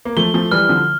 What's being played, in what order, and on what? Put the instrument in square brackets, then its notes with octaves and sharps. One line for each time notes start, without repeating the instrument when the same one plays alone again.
[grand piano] A#3
[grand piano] F3 A3 [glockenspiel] G7
[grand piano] F3 A3
[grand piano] E3 G3 [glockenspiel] F6
[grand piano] D3 F3